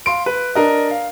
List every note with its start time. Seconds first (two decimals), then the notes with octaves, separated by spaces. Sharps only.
0.06 F5 C6 D7
0.26 B4
0.55 D4 A#4 D#5
0.91 F5